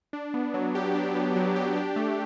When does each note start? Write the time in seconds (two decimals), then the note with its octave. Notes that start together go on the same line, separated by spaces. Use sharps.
0.13 D4
0.34 B3
0.54 F#3
0.75 G4
0.95 D4
1.15 B3
1.36 F#3
1.56 G4
1.76 D4
1.96 A3